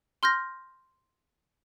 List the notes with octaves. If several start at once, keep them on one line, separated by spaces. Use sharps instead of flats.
C6 F6 G6 A#6